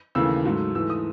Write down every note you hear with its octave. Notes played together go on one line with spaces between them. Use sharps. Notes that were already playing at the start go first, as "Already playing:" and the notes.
D#2 C#3 E3 A3 E6
G#2 F#3 A3
G#2 E3 A3 E6
D#6